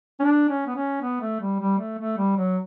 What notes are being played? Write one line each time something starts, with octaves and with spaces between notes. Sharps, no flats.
C#4
D4
C#4
B3
C#4
B3
A3
G3
G3
A3
A3
G3
F#3